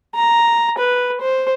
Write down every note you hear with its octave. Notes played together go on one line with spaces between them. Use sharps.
A#5
B4
C5